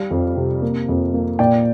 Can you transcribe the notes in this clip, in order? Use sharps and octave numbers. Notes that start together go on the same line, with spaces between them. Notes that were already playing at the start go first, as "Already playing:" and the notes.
Already playing: G3 F5
F2
C3
A#3
F2
A#3
A#2 D5 G5